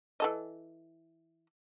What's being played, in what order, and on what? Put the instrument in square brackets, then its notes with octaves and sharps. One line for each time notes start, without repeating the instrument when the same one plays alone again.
[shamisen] E3 A4 D#5